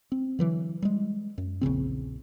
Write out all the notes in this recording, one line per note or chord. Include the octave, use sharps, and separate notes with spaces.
C4
D3 E3 F#3
G3 G#3
F#2
A#1 E2 C#3 C4